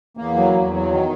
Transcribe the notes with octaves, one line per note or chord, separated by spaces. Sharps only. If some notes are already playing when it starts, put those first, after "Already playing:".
E2 A#3
F#3
E2
F#3
D#3